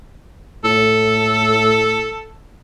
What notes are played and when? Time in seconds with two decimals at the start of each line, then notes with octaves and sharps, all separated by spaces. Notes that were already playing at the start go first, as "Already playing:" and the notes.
0.65 A2 A4